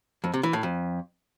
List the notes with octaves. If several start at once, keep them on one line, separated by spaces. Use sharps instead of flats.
F2
C3
E3
A2
F2